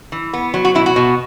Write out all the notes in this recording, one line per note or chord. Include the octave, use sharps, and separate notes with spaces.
E3
B3
F#3
F#4
B2 E4
F#4
B2